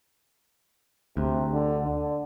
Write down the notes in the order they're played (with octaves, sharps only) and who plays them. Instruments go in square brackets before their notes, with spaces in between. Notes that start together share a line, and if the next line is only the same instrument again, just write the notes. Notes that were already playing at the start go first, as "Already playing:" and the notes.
[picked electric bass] D2 [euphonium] C3
[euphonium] D3
D3